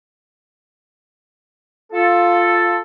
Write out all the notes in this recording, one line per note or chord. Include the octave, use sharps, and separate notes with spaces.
F4 A4